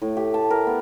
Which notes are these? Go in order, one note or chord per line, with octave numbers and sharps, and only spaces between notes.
A2
G4
A5
A#4
B3